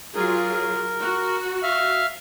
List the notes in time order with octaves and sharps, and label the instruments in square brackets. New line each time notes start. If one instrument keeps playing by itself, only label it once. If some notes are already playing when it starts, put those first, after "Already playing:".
[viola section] F#3 F4 G#4 [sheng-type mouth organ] A#4
[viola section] F#4
[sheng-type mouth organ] E5 F5 F6